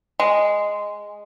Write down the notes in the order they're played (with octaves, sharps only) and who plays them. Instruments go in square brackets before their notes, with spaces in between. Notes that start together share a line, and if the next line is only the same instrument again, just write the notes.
[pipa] G#3